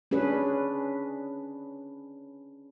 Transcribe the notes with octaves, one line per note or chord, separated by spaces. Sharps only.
C#4 D4 G#4 B4